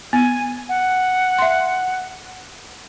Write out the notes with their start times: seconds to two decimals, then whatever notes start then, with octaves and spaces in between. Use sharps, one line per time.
0.13 B3 G#5
0.69 F#5
1.38 E5 C6